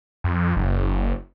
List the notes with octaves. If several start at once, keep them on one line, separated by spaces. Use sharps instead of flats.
F2
F#1